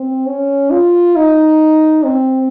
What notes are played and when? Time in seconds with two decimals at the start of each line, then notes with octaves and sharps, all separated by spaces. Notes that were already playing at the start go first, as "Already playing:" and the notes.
Already playing: C4
0.27 C#4
0.71 F4
1.16 D#4
2.04 C4